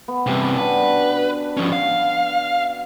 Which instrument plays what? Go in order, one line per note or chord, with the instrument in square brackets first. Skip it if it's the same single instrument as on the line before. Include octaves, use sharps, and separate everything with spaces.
[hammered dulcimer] B3
[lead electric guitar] G2 C3 [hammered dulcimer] C#4 G4 C#5
[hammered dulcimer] D4 F#4 A5 [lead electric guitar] B4
[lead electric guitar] F3 C#4
F5